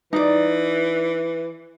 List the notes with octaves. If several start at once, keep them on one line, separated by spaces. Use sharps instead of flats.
E3 D#4 D5